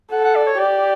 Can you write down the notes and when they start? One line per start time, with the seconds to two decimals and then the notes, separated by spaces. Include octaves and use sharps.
0.12 A4 F#5
0.24 F#5
0.35 D5
0.47 C#5
0.59 G4 D5